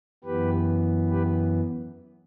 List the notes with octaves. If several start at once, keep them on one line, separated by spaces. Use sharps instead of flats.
F#2 E3 B3 G4 B4
G4 B4